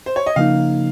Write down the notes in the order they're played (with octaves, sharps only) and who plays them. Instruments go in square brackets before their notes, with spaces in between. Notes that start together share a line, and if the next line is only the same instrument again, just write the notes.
[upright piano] C5
C#5
D#5
[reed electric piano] C#3 F3 A#3 D#4 [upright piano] F5